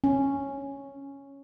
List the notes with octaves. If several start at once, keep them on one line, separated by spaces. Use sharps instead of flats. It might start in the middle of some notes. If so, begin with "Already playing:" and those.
C#4